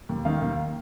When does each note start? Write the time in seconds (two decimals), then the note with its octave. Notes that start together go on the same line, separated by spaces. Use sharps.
0.09 D#2
0.25 D#3 F5
0.41 D#2